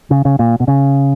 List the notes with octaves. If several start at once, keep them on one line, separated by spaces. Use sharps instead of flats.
C#3
C#3
A#2
B2
C#3